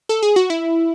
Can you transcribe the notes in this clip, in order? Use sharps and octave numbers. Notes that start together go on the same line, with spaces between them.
A4
G#4
F#4
E4